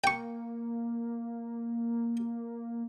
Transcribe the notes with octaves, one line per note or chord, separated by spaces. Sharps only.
A#3 G5 C#6